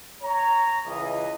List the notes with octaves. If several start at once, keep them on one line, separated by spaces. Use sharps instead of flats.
C#5 A#5
C#2 E3 D#5